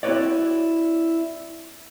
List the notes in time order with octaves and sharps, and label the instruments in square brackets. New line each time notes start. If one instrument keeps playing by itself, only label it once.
[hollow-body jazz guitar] C4 E4 F#4 B4 C#5 D5